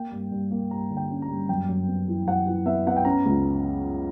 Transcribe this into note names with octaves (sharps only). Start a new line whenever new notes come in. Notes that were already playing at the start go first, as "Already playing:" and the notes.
Already playing: A#3 G5
G2
G2
A#3
G2 A#5
D3
G5
C#4
A#5
G2
F#2 G5
F#2
B3
E3
F#2 F#5
E3
B3 E5
B3 F#5
G5
C#4 A#5
C#2